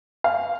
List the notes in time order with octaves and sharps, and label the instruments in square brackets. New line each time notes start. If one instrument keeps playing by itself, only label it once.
[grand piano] F5